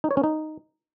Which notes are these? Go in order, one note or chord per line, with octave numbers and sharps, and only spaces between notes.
D#4
C#5
C#4
D#4